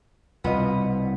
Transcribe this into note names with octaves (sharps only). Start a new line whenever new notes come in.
C2 B2 B3 F4 D#5